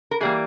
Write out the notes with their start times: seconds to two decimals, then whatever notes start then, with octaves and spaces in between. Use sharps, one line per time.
0.11 A#4
0.20 E3 G3 A#3 G#4